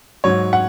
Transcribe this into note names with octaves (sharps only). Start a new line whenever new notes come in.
G#2 F#3 C#5
F#5